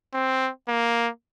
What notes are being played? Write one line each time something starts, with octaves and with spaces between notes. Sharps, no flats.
C4
A#3